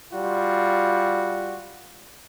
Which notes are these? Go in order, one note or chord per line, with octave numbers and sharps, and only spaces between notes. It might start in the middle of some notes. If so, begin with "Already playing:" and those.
G3 F4 F#4